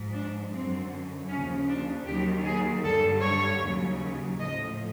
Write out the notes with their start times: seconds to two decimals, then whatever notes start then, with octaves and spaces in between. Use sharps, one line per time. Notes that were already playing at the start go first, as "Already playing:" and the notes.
Already playing: G#2 F3
0.12 D4
0.51 F#2 D3 F#3 C4
1.28 D#2 C#3 F3 C#4
1.67 D4
2.05 D#2 D#3 F#3 G4
2.44 G#4
2.83 G2 D3 G3 A4
3.23 C#5
3.61 D#2 C#3 F#3
4.39 A2 F3 D#5